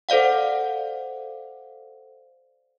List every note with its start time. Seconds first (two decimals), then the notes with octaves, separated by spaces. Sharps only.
0.09 A4 C5 D5 F5 F#5